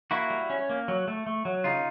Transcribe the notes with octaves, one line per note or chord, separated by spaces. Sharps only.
A#3 E4 F#4
G3
C#4
A#3
F#3
A3
A3
F#3
C#3 D#4 F4